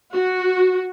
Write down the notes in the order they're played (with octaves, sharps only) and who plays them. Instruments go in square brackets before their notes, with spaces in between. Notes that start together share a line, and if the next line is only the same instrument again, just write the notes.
[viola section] F#4